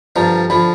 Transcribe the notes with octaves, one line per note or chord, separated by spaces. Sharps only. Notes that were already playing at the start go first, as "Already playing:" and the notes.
G2 D3 F3 A#5
D3 F3 B5